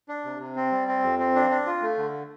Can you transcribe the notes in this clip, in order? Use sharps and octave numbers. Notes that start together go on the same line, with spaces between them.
D4
C3
C3
C4
G3
C4
F2
C4
D4
D4
F4
A3
D3